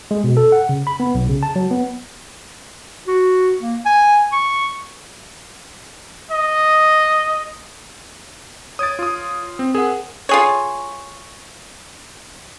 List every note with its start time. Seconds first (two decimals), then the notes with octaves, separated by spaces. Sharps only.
0.11 G#3
0.24 B2
0.37 A4
0.52 F#5
0.69 C#3
0.87 B5
1.00 B3
1.15 B1
1.29 C#3
1.43 A5
1.56 F#3
1.71 B3
3.07 F#4
3.60 A#3
3.86 G#5
4.32 C#6
6.31 D#5
8.79 C#5 D#6 G#6 A6 D7
8.99 F4 D#6
9.59 C4
9.75 G#4 A#4 C5 F#5
10.29 F4 G#4 C#5